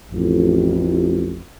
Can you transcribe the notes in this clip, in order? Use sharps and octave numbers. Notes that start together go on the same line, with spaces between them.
A1 F2